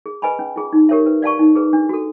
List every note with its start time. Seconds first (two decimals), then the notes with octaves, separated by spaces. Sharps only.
0.06 G#4
0.22 B4 D#5 G#5 B5
0.39 C#4
0.56 F4 G#4
0.73 D#4
0.89 G4 A#4 C#5 E5
1.06 B4
1.22 D5 F5 A5 C#6
1.39 D#4
1.56 G#4 B4
1.73 D4
1.89 F#4 A4